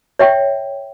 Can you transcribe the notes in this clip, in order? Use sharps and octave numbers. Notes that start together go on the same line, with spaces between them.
C#5 E5 G5